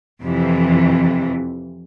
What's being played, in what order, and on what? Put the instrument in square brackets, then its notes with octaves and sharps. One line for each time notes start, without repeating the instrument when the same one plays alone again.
[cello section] F2 C3 E3